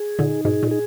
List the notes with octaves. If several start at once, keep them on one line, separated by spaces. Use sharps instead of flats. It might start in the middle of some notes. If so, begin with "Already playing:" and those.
Already playing: G#4
A#2 D3 D#4
G#2 B2 G#4
A#2
G#4